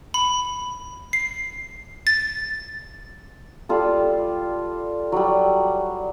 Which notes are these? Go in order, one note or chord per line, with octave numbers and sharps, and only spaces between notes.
B5
C7
A6
G3 F4 A4
F#3 G3